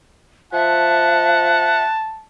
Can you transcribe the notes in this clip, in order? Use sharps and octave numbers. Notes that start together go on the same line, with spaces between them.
F3 E5 F#5 A5